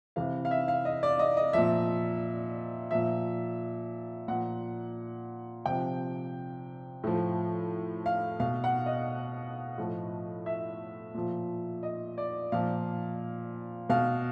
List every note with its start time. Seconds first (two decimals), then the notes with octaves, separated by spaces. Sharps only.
0.16 C3 E3 F5
0.45 F5
0.51 E5
0.68 F5
0.85 D#5
1.03 D5
1.19 D#5
1.37 D#5
1.53 A#2 F3 E5
2.91 A#2 F3 E5
4.28 A#2 F3 F#5
5.66 C3 F3 G5
7.04 A2 F3
8.06 F5
8.40 B2 F5
8.64 F#5
8.86 D#5
9.78 A2 F3
10.46 E5
11.14 A#2 F3
11.83 D#5
12.18 D5
12.52 A#2 F3 F5
13.89 B2 F5